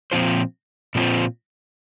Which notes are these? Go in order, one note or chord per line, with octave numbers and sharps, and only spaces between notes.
A#2 F3 C4 F4 C5
A#2 F3 C4 F4 C5